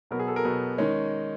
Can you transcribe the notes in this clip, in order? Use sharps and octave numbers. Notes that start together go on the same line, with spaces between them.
B2 F#3 B3 A#4
G#4
A4
A#4
B2 F#3 B3
D#3 G#3 C#4